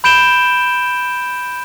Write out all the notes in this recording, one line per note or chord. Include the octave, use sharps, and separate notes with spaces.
B5 G6 D7 E7 G7